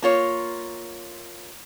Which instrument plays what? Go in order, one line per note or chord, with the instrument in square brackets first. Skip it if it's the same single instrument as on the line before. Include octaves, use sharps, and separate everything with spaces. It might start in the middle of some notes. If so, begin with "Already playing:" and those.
[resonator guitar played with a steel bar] A#3 F4 C#5